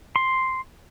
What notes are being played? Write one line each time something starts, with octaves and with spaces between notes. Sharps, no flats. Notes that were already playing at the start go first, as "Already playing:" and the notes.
C6